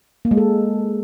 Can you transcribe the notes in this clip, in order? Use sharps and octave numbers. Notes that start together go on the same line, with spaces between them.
A#3
G#3
A4